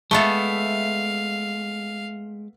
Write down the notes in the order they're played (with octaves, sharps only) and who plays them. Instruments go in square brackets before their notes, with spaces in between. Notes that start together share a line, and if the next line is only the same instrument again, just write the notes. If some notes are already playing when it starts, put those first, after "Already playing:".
[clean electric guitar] G#3 [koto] A3 B3 A4 [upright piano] E5 C#7 G7 [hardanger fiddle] F5